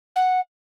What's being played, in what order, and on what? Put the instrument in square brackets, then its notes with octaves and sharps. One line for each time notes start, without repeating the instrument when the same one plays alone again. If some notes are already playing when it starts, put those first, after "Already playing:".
[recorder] F#5